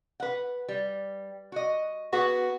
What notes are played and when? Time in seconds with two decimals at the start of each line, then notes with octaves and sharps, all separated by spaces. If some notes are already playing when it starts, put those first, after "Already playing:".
0.20 B4 F#5
0.68 G3
1.52 F#4 D#5
2.13 B3 F#4 G#4 B4